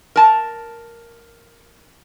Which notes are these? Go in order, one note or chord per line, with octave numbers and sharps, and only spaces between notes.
A#4 A5